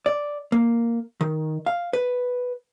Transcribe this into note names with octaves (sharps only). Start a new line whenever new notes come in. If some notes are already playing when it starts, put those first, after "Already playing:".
D5
A#3
D#3
F5
B4